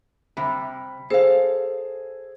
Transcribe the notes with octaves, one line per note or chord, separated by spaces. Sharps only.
C3 G3 B5
G#4 A4 C5 F5